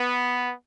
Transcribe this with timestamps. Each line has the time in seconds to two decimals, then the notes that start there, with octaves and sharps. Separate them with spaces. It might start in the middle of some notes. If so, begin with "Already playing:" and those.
Already playing: B3